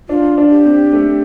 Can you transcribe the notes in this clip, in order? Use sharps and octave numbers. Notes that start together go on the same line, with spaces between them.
D4 F4
D4
G4
C4
A3